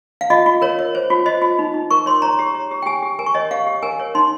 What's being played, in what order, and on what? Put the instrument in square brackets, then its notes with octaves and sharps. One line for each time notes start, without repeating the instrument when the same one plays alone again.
[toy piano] F5
F4 D#5
F4
A#4 C#5
C#5
C5
F4
C5 D#5
F4
D#4
D#4
A#4 C#6
C#5 C6
C#5 A#5
G4
C#5
G4
G5
G4 G#5
G4
A#4 G#5
C#6
C#5 D#5
G4 F5
G4
A#4 G#5
C#5
D#4 C6